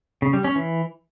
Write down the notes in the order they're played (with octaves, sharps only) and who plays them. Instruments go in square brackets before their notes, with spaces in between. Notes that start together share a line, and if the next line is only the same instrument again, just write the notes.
[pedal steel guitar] C#3
G3
C#4
E3